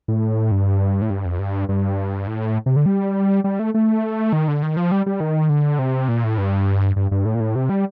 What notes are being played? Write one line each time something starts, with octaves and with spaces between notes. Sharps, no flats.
A2
G2
A2
G2
F2
G2
G2
A2
C3
D3
G3
G3
A3
A3
D#3
D3
D#3
F3
G3
G3
D#3
D3
C3
A#2
A2
G2
G2
G2
A2
A#2
A2
C3
G3